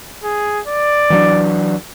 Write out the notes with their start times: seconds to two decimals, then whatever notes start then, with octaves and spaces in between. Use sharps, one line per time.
0.24 G#4
0.67 D5
1.10 E3 F#3 D4